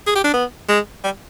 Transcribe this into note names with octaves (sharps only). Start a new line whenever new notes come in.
G#4
G4
D4
B3
G#3
G3